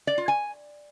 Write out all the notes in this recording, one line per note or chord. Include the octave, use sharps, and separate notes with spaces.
D5
F4
G#5